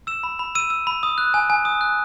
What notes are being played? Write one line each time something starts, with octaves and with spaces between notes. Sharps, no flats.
E6 E7
B5
B5
E6 D#7
E6
B5
D#6
F#6
G#5
G#5
D#6
F#6